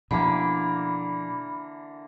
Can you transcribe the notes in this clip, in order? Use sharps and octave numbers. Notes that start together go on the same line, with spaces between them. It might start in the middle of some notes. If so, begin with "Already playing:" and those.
B2 D3 E3 F3 A#3 B5